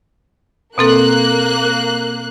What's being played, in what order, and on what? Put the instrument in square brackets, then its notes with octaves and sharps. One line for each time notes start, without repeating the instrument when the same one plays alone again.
[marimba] B2 C4 A4 [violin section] A#3 F#6